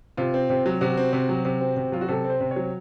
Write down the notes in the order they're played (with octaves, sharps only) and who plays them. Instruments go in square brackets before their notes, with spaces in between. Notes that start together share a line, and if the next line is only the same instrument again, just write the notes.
[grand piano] C3 F4
C4
C3
F#3
C3 F#4
C4
C3
F#3
C3
C4
C3
F#3 F4
F#4
C3 A4
C4
C5
C3
C#5
F#3